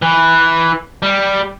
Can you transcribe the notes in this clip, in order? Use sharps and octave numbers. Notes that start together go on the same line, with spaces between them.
E3
G3